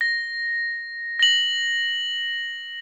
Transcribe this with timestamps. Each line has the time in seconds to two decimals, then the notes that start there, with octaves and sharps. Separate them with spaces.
0.01 A#6
1.19 A#6 F#7